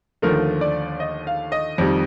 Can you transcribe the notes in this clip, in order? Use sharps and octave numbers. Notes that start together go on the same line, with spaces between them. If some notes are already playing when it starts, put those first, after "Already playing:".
D#2 D3 F3 A3 A#4
D5
D#5
F5
D#5
F2 D#3 G3